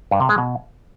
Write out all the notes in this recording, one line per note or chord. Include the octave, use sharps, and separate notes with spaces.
G2
C3
G#3
B2